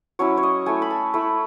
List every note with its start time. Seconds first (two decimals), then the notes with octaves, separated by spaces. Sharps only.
0.19 F#3 C#4 E4 C#5
0.37 C#5
0.43 D#5
0.66 A3 E4 G#5
0.82 B5
0.90 A5
1.14 A3 E4 B5